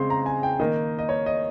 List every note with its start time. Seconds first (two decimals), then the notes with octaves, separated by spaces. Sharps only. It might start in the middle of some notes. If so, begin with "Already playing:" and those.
Already playing: C#3 G#3 C4 C6
0.10 A#5
0.26 G#5
0.43 G5
0.60 D#3 A#3 D#4 D#5
0.99 D#5
1.09 C#5
1.26 D#5